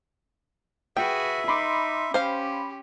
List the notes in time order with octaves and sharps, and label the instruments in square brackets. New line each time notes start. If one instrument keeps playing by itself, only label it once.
[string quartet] F#4 G#4 B4 [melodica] E5 [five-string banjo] G5
[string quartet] D#4 [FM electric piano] B5 C6 D6
[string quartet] C#4 G4 [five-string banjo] C5 F5